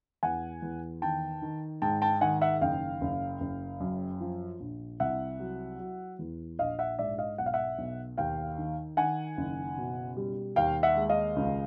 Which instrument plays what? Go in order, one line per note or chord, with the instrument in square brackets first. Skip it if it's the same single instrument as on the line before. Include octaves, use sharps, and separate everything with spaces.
[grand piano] E2 F#5 G#5
E2
D#3 G5 A5
D#3
G#2 G5 A5
G5 A5
D#3 F#5 G#5
E5 F#5
F#1 F5 G5
F#1
F#1
F#2
F3
A#1
C2 E5 F#5
F#3
F#3
E2
A#1 D#5 F5
E5 F#5
G#2 D5 E5
D#5 F5
B1 F#5
F5
E5 F#5
B1
D#2 F5 G5
D#3
D#3 F#5 G#5
F#1
B2
G3
D#2 F5 G5
E5 F#5
G#3
D#5 F5
C#2